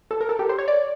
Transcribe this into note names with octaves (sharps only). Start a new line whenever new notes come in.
A4
A#4
A4
G4
C5
C#5
D5